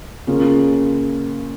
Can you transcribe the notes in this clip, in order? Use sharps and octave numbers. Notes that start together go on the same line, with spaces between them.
C#3 A#3 C#4 F4 G#4